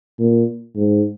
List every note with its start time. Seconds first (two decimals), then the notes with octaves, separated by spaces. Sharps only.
0.19 A#2
0.76 G#2